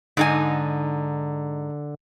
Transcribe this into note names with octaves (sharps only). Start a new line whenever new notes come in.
G#2 D3 D#4 G#5